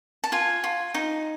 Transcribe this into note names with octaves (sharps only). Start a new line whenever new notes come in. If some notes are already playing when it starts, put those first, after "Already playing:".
A5
F4 G#5
F4
D#4